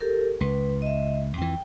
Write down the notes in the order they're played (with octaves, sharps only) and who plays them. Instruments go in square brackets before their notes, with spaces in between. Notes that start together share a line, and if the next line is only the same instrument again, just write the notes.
[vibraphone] G4 A4 A#4
[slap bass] C#2 [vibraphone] B4
[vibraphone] D#5 E5
[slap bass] F2 E3 [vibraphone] G5